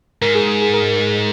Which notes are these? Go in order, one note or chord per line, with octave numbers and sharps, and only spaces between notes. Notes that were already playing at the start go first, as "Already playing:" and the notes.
G#2 A#4
G#4
G#4
G#4
A#4